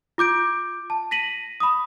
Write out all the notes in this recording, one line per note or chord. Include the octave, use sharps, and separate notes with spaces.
F4 D6 G6 D7
A5
A#6 B6 D#7 F#7
B5 D#6